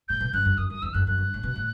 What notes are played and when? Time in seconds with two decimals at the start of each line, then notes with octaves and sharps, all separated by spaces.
0.08 A2 G6
0.21 B2
0.33 G2 F#6
0.45 F#2
0.58 F#2 D#6
0.69 F#2 D#6
0.82 E2 E6
0.94 F#2 F#6
1.07 F#2 F#6
1.18 G2
1.34 A2
1.43 B2
1.56 A2